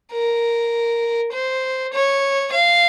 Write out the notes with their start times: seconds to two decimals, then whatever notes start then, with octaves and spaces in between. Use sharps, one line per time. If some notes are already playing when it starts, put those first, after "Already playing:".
0.13 A#4
1.32 C5
1.93 C#5
2.52 F5